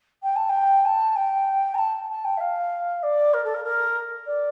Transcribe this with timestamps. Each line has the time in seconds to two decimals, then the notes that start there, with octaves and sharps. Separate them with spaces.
0.22 G5
0.35 A5
0.49 G5
0.85 A5
1.15 G5
1.74 A#5
1.77 A5
2.09 A5
2.24 G5
2.37 E5
2.40 F5
3.02 D5
3.33 A#4
3.44 A4
3.53 A#4
3.64 A#4
4.26 D5